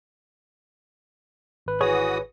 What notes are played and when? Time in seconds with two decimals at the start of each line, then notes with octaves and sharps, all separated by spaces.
1.66 G#1 B4
1.81 E3 F#4 G#4 C#5 D#6